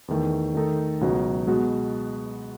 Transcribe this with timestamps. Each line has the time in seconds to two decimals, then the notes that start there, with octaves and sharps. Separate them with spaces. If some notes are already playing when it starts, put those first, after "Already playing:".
0.08 E2 D#3 A3
0.55 D#3 A3 D#4 A4
1.01 C#2 B2 F#3 B3
1.47 B2 G#3 B3 F#4